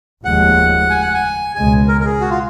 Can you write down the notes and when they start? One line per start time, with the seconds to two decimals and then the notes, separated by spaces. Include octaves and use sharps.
0.25 F1 D#2 C#3 F3 G#3 F#5
0.90 G#5
1.02 F#5
1.14 G#5
1.56 C#2 B2 G#3 G#5
1.88 A#4
2.01 A#4
2.05 G#4
2.21 F#4
2.30 F4